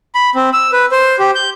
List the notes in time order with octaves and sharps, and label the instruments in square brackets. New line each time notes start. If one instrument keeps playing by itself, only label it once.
[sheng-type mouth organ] B5
C4
E6
B4
C5
G4
G6